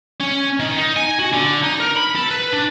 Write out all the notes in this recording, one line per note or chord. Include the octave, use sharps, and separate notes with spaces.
C#4
D#3
D#4
G#5
F#4
D3
D#4
A#4
B5
A4
B4
D4